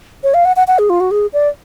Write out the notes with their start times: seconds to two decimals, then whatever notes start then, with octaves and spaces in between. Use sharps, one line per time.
0.23 C#5
0.34 F5
0.45 F#5
0.56 F#5
0.68 F#5
0.79 G#4
0.90 F4
1.00 F#4
1.11 G#4
1.33 D5